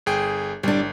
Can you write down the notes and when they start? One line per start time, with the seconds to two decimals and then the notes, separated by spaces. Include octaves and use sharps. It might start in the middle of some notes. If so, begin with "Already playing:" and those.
0.06 G1 G#4 G5
0.63 G1 G3 D4